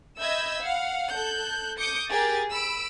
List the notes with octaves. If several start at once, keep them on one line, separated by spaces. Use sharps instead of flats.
D#5 E5 B5 E6 G6 G#6
F5 F#5
A4 F#6 G6
D6 D#6 G6 C#7
G4 G#4 A#4 A6
B5 E6 D7